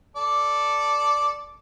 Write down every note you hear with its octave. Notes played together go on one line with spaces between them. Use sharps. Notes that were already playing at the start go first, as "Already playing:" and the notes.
A4 D5 A5